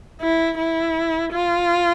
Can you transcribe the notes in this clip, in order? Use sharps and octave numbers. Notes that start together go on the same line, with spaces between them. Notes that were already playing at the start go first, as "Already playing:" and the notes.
E4
E4
F4